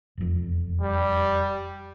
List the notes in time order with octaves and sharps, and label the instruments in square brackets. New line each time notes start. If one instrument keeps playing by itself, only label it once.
[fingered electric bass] E1 F2
[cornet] G3